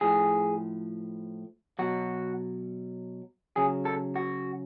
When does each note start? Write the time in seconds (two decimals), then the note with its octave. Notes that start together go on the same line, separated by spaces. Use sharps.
0.01 A2 F3 G#4
1.79 B2 F#3 F#4
3.56 C#3 F#3 G#4
3.85 A4
4.16 F#4